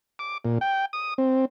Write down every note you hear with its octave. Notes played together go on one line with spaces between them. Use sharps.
D6
A#2
G5
D#6
C4